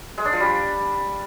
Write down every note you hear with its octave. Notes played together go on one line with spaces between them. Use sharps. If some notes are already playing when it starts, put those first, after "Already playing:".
G#3
D4
F3
G3